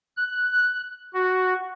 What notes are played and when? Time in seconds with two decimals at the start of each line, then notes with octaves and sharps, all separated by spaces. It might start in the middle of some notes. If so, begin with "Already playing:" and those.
0.17 F#6
1.14 F#4